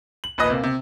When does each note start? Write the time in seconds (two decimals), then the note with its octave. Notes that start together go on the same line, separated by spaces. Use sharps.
0.24 F#7
0.38 A#1 D#2 B4 D#5 D#6
0.50 C3 A#3
0.63 C3